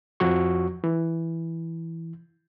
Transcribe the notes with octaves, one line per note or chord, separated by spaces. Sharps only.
F2 F3 F#4 C#6
E3